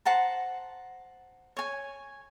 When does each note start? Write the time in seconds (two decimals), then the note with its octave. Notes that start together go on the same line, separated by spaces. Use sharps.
0.05 C5 F#5 A5 A#5
1.57 C#5 G#5